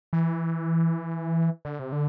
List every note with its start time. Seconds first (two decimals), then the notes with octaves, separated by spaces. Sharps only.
0.13 E3
1.65 D3
1.79 C3
1.92 D3